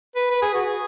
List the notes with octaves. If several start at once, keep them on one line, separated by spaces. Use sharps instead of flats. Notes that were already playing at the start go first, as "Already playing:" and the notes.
B4
B4
G#4
F#4
G#4